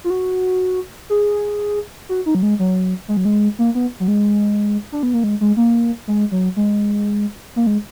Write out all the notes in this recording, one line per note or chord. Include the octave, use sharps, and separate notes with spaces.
F4
F#4
G#4
F#4
D#4
F#3
G#3
F#3
G#3
F#3
G#3
A#3
B3
F#3
G#3
D4
B3
A#3
G#3
G#3
A#3
G#3
F#3
G#3
A#3
G#3